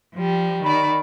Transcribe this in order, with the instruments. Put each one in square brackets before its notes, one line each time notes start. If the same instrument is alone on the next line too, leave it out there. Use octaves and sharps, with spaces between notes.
[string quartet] F3 G3
[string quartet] D#3 D5 [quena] B5